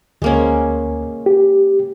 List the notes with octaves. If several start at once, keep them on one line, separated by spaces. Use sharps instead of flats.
D2 G#3 A#3 C#4
G4